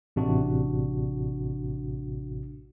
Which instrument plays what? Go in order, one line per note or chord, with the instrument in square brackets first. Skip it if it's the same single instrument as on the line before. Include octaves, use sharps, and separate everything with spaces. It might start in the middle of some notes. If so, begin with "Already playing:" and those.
[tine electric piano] A1 C3 D4 F#4